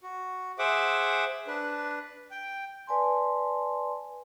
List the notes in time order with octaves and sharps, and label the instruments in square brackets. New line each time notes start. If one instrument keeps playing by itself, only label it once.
[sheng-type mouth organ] F#4
G#4 C5 E5 F#5 D6
D4 B4
G5
[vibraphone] B4 D5 G#5 A5 C6